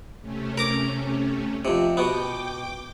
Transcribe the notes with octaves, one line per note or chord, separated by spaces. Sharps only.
C3 A3 C#4
A#4 A#5 D6
F2 C3
B2 B3 G5 D6